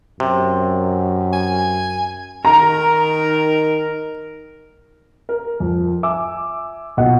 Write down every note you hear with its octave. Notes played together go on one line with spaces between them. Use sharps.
F#2 C3
G#5
D#3 A#4 A#5
A#4
F2
E5 G#5 D6 E6
B1 A#2 F#4 D#5 F#5